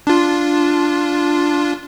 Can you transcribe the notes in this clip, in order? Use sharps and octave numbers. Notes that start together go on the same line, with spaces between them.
D4 F4